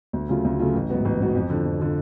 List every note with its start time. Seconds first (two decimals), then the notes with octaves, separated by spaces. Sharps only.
0.13 D2
0.29 C#3 F#3 A3 F4
0.45 D2
0.59 C#3 F#3 A3 F4
0.75 A1
0.89 G#2 F#3 B3 F#4
1.05 A1
1.20 G#2 F#3 B3 F#4
1.35 F2
1.50 D3 F3
1.66 F2
1.80 D3 F3